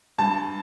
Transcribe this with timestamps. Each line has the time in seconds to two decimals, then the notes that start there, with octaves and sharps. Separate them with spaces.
0.18 G2 A5